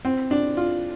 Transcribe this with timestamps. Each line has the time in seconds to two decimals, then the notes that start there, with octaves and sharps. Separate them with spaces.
0.05 C4
0.31 D4
0.57 F4